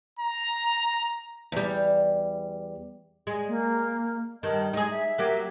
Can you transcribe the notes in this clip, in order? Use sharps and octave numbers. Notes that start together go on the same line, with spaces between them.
A#5
E2 G3
G#3
A#3
G2 D#3 D#5
G#3 D#4 G#4
E5
F#3 A#3 G4